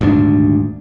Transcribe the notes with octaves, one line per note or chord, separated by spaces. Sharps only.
D#1 D2 G#2 D4